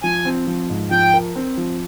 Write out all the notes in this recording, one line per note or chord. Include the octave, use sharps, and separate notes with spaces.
F3 G#5
C4
F3
G#2
F3 G5
A#4
C4
F3